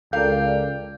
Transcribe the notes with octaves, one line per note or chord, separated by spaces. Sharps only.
C#2 A4 A#4 D5 F5 G5